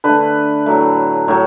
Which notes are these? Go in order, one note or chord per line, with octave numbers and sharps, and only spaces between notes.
D3 A3 B4
A2 F#3 A3
A2 F#3 C#5